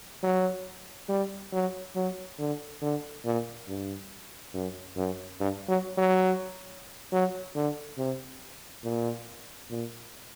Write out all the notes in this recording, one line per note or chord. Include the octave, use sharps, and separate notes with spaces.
F#3
G3
F#3
F#3
D3
D3
A#2
G2
F#2
F#2
G2
F#3
F#3
F#3
D3
C3
A#2
A#2